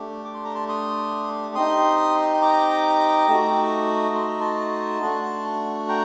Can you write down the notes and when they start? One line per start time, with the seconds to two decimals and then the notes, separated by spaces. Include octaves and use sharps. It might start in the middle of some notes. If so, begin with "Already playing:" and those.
Already playing: A3 D4 G4
0.25 D6
0.34 C6
0.45 A#5
0.55 A5 C6
0.68 C6 D#6
1.55 C4 D#4 G4 C6 D#6
2.41 A#5 D6
3.28 A3 D#4 F#4
4.15 C6
4.28 A#5
4.40 A5 C6
5.02 A3 D4 F#4
5.89 G5 A#5